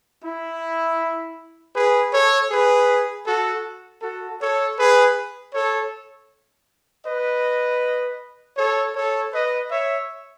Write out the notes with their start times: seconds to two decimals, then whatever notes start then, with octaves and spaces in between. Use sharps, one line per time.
0.23 E4
1.75 G#4 B4
2.13 A4 C#5
2.50 G#4 B4
3.26 F#4 A4
4.02 F#4 A4
4.40 A4 C#5
4.78 G#4 B4
5.54 A4 C#5
7.06 B4 D#5
8.57 A4 C#5
8.95 A4 C#5
9.33 B4 D#5
9.71 C#5 E5